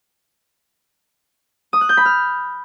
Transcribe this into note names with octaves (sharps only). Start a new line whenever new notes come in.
D#6
F#6
G6
B5
F6